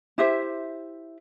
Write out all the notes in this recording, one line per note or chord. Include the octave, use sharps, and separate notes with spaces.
E4 G4 C5 E5